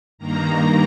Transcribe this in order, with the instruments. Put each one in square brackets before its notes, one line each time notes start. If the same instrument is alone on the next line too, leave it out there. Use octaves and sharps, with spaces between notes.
[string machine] G2 D#3 A#3 A#5